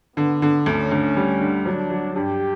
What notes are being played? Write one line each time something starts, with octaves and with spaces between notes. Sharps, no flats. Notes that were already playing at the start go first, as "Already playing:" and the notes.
D3 B3
D3
D2 C#4
D2
G3
D3
F#3 D4
F#3
G2 G4